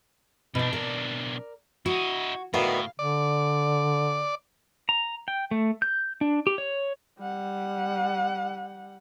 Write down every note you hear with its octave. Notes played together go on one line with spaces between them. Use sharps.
B1 B2 D4 D#4
A#4 D5
E4 F#4 D#5
D2 A2 D#3 B3 F5
D3 D5
A#5
G5
A3
G6
D4
G4
C#5
G3 F#5